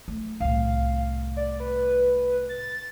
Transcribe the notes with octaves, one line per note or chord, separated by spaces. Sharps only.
A3
C2 A2 F5
D5
B4
A6